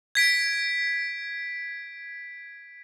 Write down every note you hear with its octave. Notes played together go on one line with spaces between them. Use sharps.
G#6 B6 D7